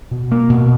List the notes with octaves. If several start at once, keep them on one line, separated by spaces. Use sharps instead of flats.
B2
A#3
B2